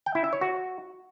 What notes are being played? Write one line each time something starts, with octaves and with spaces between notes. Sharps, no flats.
G5
E4
E5
C#5
F#4